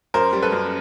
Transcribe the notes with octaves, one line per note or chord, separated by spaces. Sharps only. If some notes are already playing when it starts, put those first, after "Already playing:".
F#2 A#4 C5
G3
A4 B4
F#2